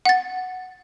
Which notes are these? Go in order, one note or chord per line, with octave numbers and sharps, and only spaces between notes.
F#5 A6